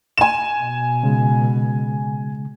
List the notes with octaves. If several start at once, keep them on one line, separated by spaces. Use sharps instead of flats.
G#5 E7
B2
C#3 G#3